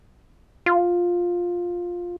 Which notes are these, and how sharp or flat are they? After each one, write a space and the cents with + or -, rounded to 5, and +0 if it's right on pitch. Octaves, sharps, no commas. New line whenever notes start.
F4 +10